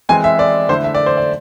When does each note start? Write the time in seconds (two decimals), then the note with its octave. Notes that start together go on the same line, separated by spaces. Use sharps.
0.09 E3 G#3 C4 G#5
0.24 E5
0.39 D5
0.69 D3 A3 E4 C5
0.84 E5
0.95 D5
1.06 C5
1.17 D5